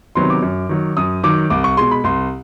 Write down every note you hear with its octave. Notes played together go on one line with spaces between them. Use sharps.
C3 D#3 F#3 B3 C6
D6
F#2
D#3 F#3
F#2 D#6
D#3 F#3 D6
C2 D6
C#6
B2 G#3 C6
B5
C2 C6